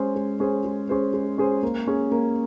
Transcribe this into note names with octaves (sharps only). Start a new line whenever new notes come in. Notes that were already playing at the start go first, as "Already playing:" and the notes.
Already playing: G#3 C#4 G#4 C5
G#3
C#4 G#4 C5
G#3
C#4 G#4 C5
G#3
C#4 G#4 C5
A#3
C#4 G#4
A#3